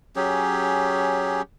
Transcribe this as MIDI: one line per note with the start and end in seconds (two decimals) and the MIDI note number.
0.16 1.42 54
0.16 1.42 61
0.16 1.42 67
0.16 1.42 68